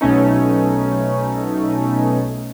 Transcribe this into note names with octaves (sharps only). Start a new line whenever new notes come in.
B1 B2 A3 C#4 D#4